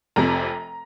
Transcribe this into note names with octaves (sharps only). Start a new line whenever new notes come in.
F1 F2 C3 A#5